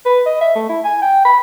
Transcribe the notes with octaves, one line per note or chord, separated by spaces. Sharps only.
B4
D#5
E5
A3
E4
G#5
G5
B5